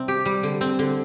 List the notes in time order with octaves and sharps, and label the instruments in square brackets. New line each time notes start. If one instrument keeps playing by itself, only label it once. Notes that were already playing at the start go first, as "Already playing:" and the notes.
Already playing: [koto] C3 G3 C4
G4
G3
D3
C4
D3